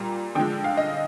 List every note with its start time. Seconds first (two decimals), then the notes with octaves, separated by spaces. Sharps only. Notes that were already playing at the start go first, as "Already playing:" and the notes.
Already playing: A#2 G3 A#5
0.35 D3 F3 G#3 G5
0.64 F5
0.77 D#5